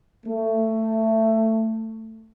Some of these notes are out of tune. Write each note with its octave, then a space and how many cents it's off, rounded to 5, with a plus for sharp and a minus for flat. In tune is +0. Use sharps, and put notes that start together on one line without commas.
A3 +15